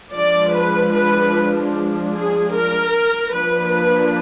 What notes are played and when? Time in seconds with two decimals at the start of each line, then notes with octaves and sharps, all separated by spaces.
0.15 F3 G#3 D4 D5
0.55 B4
0.95 B4
2.13 G#4
2.54 A#4
3.33 F3 A#3 D4 B4